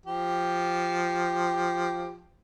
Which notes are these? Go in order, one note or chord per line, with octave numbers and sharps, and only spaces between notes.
F3 G4